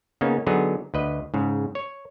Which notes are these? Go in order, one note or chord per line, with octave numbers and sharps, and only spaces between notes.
C#3 A#3 B3 C#4 D#4
D3 F#3 B3 D#4 G#4
D2 B4 D#5
G#2 C#3
C#5